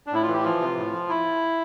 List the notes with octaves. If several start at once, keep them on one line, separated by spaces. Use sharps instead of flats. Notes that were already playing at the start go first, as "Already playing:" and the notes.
D4
A2 E4
F4
E3
G4
F3 F4
C3
A2
F3
E4